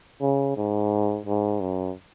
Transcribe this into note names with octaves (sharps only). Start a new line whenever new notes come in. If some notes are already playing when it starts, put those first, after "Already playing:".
C#3
G#2
G#2
F#2